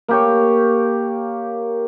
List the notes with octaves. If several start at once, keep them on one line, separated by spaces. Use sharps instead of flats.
A#3 G4 C#5